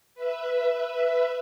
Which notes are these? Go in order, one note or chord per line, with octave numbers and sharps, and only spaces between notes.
B4 E5